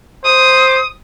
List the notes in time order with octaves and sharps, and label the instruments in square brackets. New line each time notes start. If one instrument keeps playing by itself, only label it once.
[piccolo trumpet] C5 [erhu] D#6